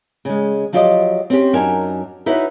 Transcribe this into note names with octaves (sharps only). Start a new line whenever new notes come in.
C#3 G#3
F3 F#3 F4 G4 C5 D#5
C4 C#4 G4
F#2 D4 D#4 A#4 G#5
D#4 E4 F#4 B4 C#5